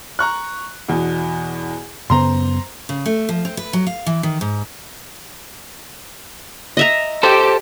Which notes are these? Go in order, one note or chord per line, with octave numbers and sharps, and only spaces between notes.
A#5 C#6 F#6
E2 B2
F#2 C#3 B3 C5 A#5 C6
C#3
A3
F3
C4
B4
F#3
F5
E3
D#3
G#2
D#5 E5 A#5
G4 A4 C5